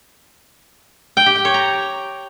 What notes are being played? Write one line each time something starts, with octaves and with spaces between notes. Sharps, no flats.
G5
G4
G5
C#5
A#5